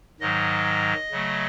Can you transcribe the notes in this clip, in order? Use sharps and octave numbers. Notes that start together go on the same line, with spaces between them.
G#2 D#3 F#3 D#5
C#3 F#3 A3